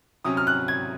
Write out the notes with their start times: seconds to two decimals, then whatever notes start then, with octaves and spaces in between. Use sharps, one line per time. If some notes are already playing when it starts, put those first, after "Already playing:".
0.25 C3 F#3 C#4 D#6
0.37 F6
0.47 F#6
0.68 G#6